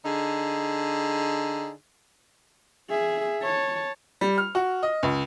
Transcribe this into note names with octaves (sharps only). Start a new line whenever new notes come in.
D3 D#4 G#4
G#4 E5
C#5 A5
G3
F6
F#4
D#5
C#2